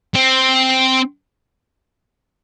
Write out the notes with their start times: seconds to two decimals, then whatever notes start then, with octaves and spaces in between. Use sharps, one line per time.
0.15 C4